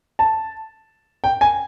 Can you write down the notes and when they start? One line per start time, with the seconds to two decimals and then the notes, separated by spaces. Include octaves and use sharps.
0.19 A5
1.24 G5
1.41 G#5